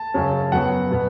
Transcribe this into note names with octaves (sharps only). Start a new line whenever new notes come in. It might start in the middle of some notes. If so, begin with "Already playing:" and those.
Already playing: A5
F#2 C#3 F#3 C#4
F#2 F#3 B3 F#5
B2 B3